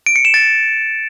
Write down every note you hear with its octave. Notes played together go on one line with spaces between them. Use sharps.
D7
C#7
E7
A6